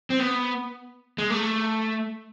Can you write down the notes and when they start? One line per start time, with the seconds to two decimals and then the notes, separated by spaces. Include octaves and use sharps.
0.10 C4
0.19 B3
1.18 G#3
1.30 A3